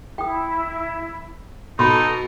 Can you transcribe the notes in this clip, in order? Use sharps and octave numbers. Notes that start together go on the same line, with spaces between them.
E4 G5 D#6
B2 D#4 A4 B5 C6